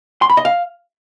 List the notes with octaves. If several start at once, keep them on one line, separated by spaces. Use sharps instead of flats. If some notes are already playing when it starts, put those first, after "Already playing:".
C6
B5
D#5
F5